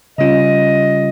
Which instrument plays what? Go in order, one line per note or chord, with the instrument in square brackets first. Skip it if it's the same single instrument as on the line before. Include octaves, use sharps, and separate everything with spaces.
[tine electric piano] C#3 G3 C#4 F4 [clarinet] D#5